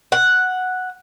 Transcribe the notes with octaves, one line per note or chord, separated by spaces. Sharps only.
F#5